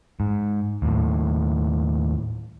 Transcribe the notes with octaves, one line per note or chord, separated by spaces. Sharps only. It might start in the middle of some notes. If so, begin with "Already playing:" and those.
G#2
D#2 A2